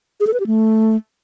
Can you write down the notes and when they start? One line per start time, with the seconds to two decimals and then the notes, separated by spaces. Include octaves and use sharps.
0.20 G#4
0.27 A4
0.33 B4
0.40 G4
0.47 A3